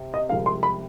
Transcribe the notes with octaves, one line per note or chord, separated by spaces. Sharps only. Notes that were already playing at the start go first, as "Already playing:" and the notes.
Already playing: C3
D#5
C2 C3 F3 G#3 F5
C6
B5